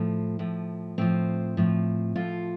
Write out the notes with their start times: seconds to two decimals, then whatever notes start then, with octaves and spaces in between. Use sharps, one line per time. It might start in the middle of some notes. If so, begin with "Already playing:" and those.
Already playing: A2 F3
0.39 A2 F3
0.98 A2 F3 C4
1.57 A2 F3
2.16 A2 F3 F4